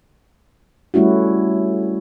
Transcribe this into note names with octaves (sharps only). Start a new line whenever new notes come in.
G3 A3 C#4 E4 F#4